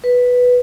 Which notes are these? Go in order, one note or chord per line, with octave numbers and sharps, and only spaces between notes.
B4